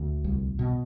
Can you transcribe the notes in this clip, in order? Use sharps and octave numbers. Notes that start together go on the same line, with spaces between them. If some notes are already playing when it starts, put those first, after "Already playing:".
Already playing: D2
C2
B2